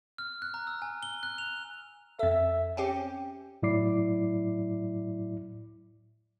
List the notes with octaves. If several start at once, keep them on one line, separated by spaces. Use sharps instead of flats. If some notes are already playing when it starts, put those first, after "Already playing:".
F6
F#6
A#5
E6
G#5
G7
F#6
F7
F2 A4 E5
C4 C#4 G4 G5
A2 F#3 E4 D5 D6 C7